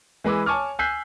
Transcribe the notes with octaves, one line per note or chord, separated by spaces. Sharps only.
E3 G#3 B4 D6 E6
C#5 G#5 A5 C#6 D6 F6
G#5 E6 F#6 G6 B6 C7